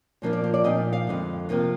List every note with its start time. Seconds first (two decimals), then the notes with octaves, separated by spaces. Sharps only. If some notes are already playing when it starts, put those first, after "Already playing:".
0.22 A#2 F3 A#3 D4 F4
0.33 D5
0.44 C5
0.54 D5
0.64 A#2 F3 C4 D#4 D#5
0.93 F5
1.07 F2 D3 G#3
1.49 C3 F3 A#3 F4